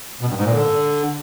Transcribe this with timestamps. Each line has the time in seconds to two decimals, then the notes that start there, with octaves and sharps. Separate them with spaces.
0.21 B2
0.29 G2
0.37 G#2
0.45 A#2
0.52 D3